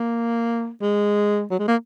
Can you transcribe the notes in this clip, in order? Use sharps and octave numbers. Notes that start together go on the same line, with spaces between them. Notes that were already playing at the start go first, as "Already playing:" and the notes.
Already playing: A#3
G#3
F#3
G#3
A#3